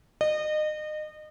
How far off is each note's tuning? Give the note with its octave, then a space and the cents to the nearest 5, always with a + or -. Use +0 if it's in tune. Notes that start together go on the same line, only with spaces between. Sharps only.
D#5 -30